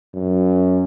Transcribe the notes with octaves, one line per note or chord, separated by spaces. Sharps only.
F#2